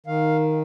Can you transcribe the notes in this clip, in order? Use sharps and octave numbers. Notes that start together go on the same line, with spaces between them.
D#3 F5